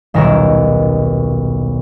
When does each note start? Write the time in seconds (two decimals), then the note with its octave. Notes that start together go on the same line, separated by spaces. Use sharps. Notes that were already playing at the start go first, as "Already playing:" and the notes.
0.14 D#1 B1 A#4 C#5 A#5 E6